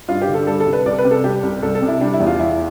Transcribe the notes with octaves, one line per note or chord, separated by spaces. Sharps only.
G2 F4
G4
D3
A4
G3 A4
A4
C2
B4
C2 D5
B4
C3
A4
G3 G4
C2
C2 A4
A4
C3
E4
G3 D4
E4
E2
F4
E2 E4